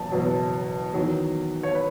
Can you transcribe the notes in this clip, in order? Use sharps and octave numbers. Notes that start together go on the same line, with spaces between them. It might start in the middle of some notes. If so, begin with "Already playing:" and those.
Already playing: F#1 E2 B2 F#3 A5
F#1 E2 B2 F#3
E2 D#3 F#3
C#5
B4